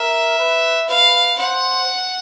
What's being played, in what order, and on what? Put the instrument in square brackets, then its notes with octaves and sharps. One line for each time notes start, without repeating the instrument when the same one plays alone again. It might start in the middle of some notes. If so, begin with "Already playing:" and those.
Already playing: [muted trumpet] A#4 [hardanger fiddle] E5
[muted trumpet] B4
[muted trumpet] B4 [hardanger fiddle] F5
[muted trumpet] C5 [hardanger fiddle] F#5